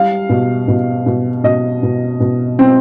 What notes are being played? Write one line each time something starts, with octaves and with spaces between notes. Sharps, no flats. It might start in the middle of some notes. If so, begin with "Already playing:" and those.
Already playing: G3 F5
B2
B2
B2
B2 D#5
B2
B2
C4